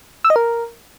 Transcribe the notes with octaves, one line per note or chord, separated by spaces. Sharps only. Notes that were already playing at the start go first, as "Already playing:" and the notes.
E6
D#5
A#4